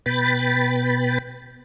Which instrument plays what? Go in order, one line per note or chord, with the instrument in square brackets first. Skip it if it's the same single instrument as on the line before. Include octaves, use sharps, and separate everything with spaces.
[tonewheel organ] B2 B4 G5 B5 A6